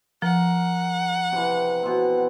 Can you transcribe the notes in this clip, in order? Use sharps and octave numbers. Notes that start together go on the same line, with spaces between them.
F3 A#4 F#5
C3 E3
B2 C4